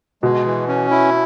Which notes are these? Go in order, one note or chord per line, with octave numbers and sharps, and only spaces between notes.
B2 G#3
E3
C#4
E4